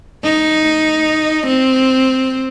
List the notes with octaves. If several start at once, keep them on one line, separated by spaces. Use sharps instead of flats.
D#4
C4